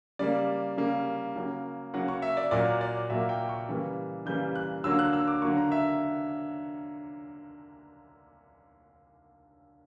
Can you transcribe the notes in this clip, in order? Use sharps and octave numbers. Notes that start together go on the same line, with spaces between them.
C#3 G3 A#3 D5
C#3 G3 A#3
C#3 F#3 A#3
C#3 F#3 A#3 F#5
C#6
E5
D5
A#2 F#3 A#3 D5
D5
A#2 F#3 A#3 E5
G5
C#6
C#3 E3 G3 A#3
C#3 E3 G3 A#3 G6
F#6
D3 F#3 A#3 E6
F#6
E6
D6
D3 F#3 A#3 C#6
A#5
E5